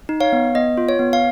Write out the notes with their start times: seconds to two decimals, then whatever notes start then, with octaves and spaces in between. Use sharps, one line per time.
0.09 D#4
0.20 C#5 F5
0.33 B3
0.55 B3 D#5
0.77 F4
0.89 C#5
0.99 B3
1.13 F5